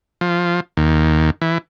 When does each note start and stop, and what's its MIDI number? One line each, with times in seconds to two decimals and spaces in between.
0.21 0.60 53
0.77 1.30 39
1.42 1.58 52